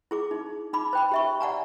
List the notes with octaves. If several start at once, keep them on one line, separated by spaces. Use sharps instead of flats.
E4 G#4 D6
D#4
D#4 B5 D6
C5 G5 B5
G4 E5 C#6
D5 F#5 G#5 A#5